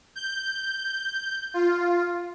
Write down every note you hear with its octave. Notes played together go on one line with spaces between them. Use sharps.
G6
F4